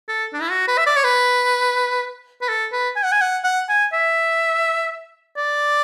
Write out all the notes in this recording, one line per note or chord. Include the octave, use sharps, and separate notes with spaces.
A4
D4
E4
F#4
B4
E5
D5
C#5
B4
B4
A4
B4
G#5
F#5
G#5
F#5
F#5
G#5
E5
D5